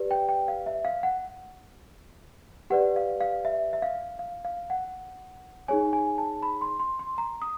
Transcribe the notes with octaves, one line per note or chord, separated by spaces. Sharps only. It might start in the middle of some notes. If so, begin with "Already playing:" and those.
Already playing: G4 B4 D5
G5
G5
F5
E5
F5
F#5
G4 B4 D5 F#5
F5
F5
E5
E5
F5
F5
F5
F#5
D#4 G#4 C#5 G#5
G#5
A5
B5
C6
C6
C6
A#5
D#6